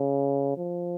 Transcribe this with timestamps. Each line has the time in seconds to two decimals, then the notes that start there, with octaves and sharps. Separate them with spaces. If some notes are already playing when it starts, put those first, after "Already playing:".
Already playing: C#3
0.57 F3